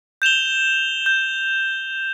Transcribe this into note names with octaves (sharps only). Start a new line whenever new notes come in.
G6 E7 F7 G7
G6